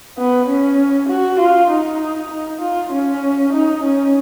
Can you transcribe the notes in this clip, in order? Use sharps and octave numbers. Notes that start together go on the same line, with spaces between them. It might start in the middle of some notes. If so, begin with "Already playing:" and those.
B3
C#4
F#4
F4
D#4
D#4
F4
C#4
D#4
C#4